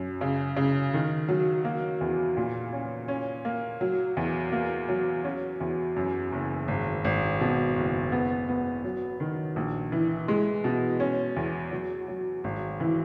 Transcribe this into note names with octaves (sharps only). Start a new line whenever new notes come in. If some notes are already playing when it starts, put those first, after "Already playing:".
Already playing: F#2
C#3
C#3
D#3
F#3
A#3
E2
A#2
C#4
C#4
A#3
F#3
E2
A#3
F#3
C#4
E2
F#2
F#1
G#1
G#1
B2
F#1
B3
B3
F#3
D#3
A#1
E3
G#3
B2
C#4
E2
F#3
F#3
G#1
E3